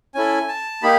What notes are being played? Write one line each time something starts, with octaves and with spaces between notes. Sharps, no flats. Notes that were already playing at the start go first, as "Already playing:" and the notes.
C#4 E4 A4 G#5
A5
A#3 D#4 G4 B5